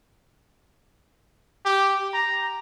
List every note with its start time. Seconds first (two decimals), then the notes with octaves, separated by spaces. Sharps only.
1.65 G4
2.14 A#5